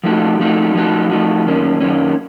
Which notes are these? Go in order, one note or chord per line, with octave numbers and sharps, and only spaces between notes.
F3 A3 D#4 F#4
F3 A3 D#4 F#4
F3 A3 D#4 F#4
F3 A3 D#4 F#4
F#2 D#3 A#3 C#4
F#2 D#3 A#3 C#4